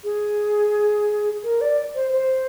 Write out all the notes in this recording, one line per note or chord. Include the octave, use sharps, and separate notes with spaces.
G#4
A#4
D5
C5
C5